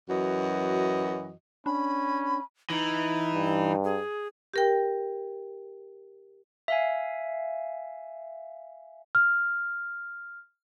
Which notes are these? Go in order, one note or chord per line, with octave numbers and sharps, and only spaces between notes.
F#2 E3 F#4 D#5
C#4 D4 B5
E3 D#4
G2
G#4
G4 A#4 G5
E5 F5 G#5
F6